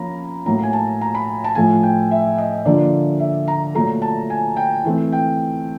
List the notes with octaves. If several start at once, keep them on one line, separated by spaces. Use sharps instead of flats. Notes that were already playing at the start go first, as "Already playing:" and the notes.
Already playing: F3 A#3 C#4 A#5 B5
A2 F#3 A#3 A#5
G#5
A5
A#5
B5
A5
A2 F3 A3 G#5
G5
E5
D#5
D3 F3 A#3 D4 D5
E5
A#5
A#2 F#3 A3 A#5
A5
G#5
G5
E3 A3 C4
G5